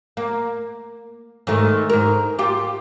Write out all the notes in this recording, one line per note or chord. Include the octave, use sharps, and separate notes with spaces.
A#3
G#2 D#3 A3
G#2 A#4
F4 G4